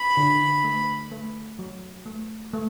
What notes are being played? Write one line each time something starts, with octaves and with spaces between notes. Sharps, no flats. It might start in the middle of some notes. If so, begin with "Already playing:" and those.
Already playing: B5
D3
A3
A3
F#3
A3
A3